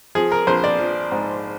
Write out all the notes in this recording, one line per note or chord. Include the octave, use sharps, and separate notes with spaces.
F3 G#4
A#4
A#1 C5
D5
F3
G#2